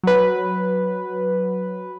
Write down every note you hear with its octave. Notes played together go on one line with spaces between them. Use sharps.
F#3 B4